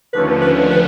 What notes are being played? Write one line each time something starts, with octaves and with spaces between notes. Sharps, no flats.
D#2 D3 F3 A3 C#4 B4
B4
B4